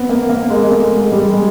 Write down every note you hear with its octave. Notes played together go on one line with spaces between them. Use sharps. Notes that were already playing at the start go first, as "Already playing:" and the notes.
Already playing: B3 C4
A#3
A#3
G#3
G#3
A3
G#3
G3
G#3